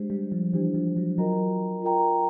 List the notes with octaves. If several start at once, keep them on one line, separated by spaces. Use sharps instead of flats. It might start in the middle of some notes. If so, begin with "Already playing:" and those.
Already playing: G#3 D4 G4 C5
G3
F3
E3 D4 G4 C5
F3
F#3
F#3 F4 A#4 D#5 G5 A#5
F4 A#4 D#5 G5 A#5